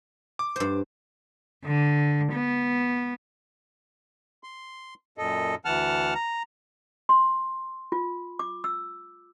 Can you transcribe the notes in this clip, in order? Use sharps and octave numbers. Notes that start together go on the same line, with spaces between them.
D6
G2 C5
D3
B3
C6
F#2 A#2 A4 D#5
D2 E3 F#5 A5 F6
A#5
C6
F4
D6
E6